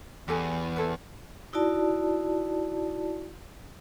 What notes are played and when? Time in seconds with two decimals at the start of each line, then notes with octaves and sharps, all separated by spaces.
0.28 E2 G4 A4 G#5
0.76 E4 A4 B4
1.53 D#4 E4 F#4 D5 A5